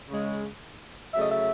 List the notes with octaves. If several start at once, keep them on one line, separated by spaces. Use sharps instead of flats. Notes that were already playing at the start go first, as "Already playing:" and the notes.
C#3 G#3
C#3 F#3 A3 E5
D#5
E5